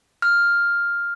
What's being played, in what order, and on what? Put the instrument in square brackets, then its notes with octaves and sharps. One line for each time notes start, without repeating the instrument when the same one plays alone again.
[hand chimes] F6